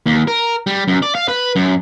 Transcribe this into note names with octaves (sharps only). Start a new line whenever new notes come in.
D#2
A#4
G3
F#2
D5
F5
B4
F#2